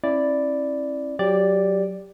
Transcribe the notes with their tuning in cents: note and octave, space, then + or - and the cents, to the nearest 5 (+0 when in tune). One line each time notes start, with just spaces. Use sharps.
C#4 -45 E4 +0 D5 +0
F#3 +0 G4 +15 D5 +0